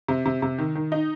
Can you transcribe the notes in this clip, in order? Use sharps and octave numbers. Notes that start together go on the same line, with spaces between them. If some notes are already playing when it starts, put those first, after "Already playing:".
C3
C3
C3
D#3
D#3
D#4